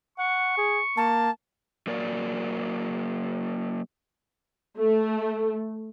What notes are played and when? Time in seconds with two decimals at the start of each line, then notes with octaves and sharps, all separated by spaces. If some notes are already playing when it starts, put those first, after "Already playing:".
0.18 F#5 C#6
0.58 G#4
0.97 A#3 A5
1.87 F#3 A#3 A#4 D5
4.79 A3